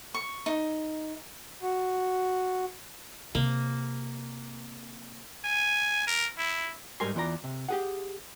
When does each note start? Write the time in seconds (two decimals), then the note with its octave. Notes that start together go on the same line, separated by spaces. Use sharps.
0.14 C#6
0.46 D#4
1.61 F#4
3.35 C3 A#3
5.44 G#5
6.07 A#4
6.38 E4
7.00 G#2 G3 A#4 G#5 C6
7.15 E2 E3 F4 D5 A#5
7.44 C3
7.69 G4 G#4 F#5